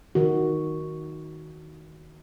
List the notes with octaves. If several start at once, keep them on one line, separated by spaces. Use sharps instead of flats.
D#3 F#4